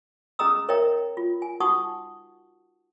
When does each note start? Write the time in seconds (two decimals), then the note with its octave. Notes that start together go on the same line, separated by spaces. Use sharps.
0.39 C#4 G#4 D#5 A#5 D#6 E6
0.69 A#4 C#5 D#5 E5 G5 A#5
1.17 F4
1.42 G#5
1.60 D#4 F#4 F#5 A5 C#6 D#6